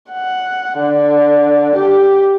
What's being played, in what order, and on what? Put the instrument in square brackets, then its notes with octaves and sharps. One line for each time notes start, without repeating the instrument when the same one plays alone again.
[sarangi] F#5
D3
G4